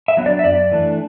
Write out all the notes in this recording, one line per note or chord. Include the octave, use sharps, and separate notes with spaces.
E5
F#3 B3 D4
D5
E5
F#2 D5
E3 A3 D4